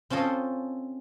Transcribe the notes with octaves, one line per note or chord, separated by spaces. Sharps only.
C4 C#4 F4 A4 D#5